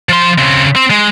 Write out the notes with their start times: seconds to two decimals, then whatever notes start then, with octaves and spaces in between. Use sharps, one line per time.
0.09 F3 C6
0.38 C#3 C4
0.76 C4
0.90 G#3